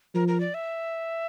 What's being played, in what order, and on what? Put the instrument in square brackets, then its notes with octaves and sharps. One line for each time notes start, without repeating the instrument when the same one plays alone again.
[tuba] F3 [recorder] A#4
[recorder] A#4
D5
E5